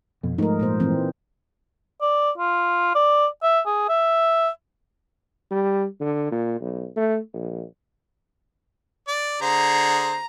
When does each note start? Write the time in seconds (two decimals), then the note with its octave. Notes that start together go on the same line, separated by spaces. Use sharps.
0.23 F2 B2
0.38 G#2 F3 A3 D#4 A#4
0.59 A#2 A#3 C5
0.80 E3 C4
2.02 D5
2.38 F4
2.95 D5
3.43 E5
3.66 G#4
3.89 E5
5.51 G3
6.00 D3
6.31 A#2
6.61 B1
6.96 A3
7.33 A#1
9.08 D5
9.42 D3 G#4 C5 A#5